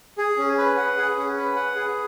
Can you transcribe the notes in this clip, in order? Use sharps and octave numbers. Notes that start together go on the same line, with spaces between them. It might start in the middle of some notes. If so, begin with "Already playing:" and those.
G#4
C#4
B4
F#5
G#4
C#4
B4
F#5
G#4